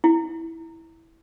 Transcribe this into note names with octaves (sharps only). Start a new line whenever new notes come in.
E4